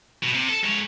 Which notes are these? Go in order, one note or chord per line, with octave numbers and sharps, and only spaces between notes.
B2
C3
A4
G#2 C#5